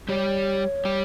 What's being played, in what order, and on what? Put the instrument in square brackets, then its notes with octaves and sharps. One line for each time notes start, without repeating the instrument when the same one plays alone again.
[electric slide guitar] G3 G4 [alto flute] C#5
[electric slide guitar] G3 G4